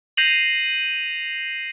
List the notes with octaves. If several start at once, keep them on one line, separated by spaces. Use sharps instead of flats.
G6 A#6 C7 D#7 F7 F#7